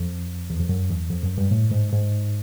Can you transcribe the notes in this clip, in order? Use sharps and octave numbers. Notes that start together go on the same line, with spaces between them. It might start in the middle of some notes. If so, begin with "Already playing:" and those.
Already playing: F2
E2
F2
F#2
E2
F2
F#2
G2
A2
G#2
G#2